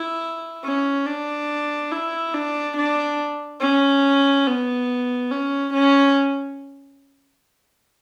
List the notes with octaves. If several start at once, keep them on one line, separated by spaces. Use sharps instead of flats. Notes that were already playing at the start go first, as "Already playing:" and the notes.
Already playing: E4
C#4
D4
E4
D4
D4
C#4
B3
C#4
C#4